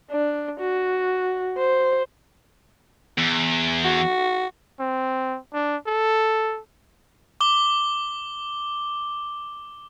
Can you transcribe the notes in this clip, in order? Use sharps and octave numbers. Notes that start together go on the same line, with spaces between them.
D4
F#4
C5
E2
F#4
C4
D4
A4
D6 G7